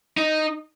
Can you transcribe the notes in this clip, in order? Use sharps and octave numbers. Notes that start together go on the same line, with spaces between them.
D#4